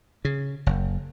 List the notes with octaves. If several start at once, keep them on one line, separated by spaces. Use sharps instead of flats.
C#3
F#1